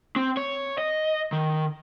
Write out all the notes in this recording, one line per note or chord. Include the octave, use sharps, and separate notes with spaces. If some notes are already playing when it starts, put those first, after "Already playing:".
C4
C#5
D#5
D#3